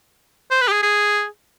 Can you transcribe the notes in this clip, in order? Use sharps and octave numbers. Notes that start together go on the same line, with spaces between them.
C5
B4
G4
G#4
G#4